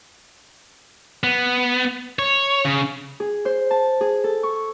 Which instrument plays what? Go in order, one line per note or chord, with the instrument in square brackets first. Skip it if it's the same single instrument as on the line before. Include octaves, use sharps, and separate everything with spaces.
[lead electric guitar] B3
C#5
C#3
[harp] G#4
C5
A5
G#4
A4
C#6